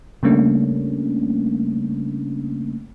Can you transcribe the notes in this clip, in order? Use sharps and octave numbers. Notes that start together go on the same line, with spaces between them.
C#3 G3 A3 A#3 C#4 D4